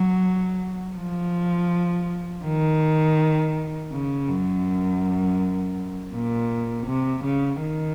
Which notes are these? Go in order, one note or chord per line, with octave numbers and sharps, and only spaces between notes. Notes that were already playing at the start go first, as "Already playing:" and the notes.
Already playing: F#3
F3
D#3
C#3
F#2
A#2
C3
C#3
D#3